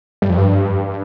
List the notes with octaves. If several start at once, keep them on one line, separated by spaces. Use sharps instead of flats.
G2
F2
G2